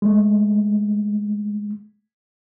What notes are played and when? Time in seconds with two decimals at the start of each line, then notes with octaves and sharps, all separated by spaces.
0.02 G#3 A3